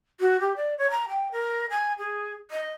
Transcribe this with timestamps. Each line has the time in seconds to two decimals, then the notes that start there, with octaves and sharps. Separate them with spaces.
0.20 F#4
0.40 G4
0.56 D5
0.78 C#5
0.90 A#5
1.08 G5
1.32 A#4
1.70 G#5
1.98 G#4
2.51 D#5